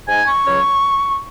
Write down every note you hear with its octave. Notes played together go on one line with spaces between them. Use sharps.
G#2 G#3 D#4 G#5
C#6
C#2 C#3 F#3 C#4